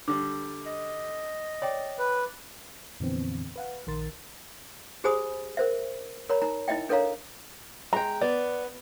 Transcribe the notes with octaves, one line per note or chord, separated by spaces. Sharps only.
D3 G3 D6
D#5
C#5 D5 G5
B4
F2 A#2 D3 E3 B3 C4
B4 F5 F#5
A#1 D#3 A#4 C6 A6
G4 G#4 C5 G#5 B5 D#6
A#4 C5 E5
A#4 C#5 A#5 B5
D#4 A#5
D#4 E4 D#5 E5 G5
D4 A4 A#4 C#5 F5 A#5
G#3 G5 A#5
B3 D5